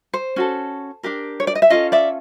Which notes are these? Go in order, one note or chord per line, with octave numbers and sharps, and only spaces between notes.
C5
C#4 F#4 A4
D4 G4 A#4
C#5
D5
D#5
E5
C#4 F4 A4 D#5 F5
D5 E5